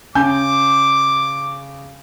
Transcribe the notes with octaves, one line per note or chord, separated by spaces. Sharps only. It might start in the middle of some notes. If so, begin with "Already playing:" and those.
C#3 G#5 D6 G6